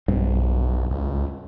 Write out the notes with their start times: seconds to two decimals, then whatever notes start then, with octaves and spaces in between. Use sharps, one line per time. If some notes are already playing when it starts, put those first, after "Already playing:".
0.08 B1 G2 C4
0.91 C#2